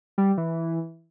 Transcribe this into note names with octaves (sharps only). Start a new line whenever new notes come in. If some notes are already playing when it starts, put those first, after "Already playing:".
G3
E3